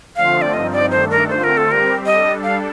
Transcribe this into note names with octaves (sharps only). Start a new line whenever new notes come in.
D3 F3 A3 C4 F4 F5
D5
G2 F3 C4 D#4 D#5
D5
G2 D#3 A3 D4 A4 C5
A#4
D3 A3 C4 F4 C5
A#4
A4
G3 C4 G4 A#4
G3 D4 A4 D#5
F5